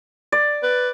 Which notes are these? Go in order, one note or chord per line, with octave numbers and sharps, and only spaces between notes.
D5
B4